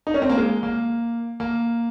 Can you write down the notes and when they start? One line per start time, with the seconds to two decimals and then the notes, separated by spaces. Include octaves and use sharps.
0.07 D#4
0.14 C#4
0.22 C4
0.29 A#3
0.37 G#3
0.63 A#3
1.40 A#3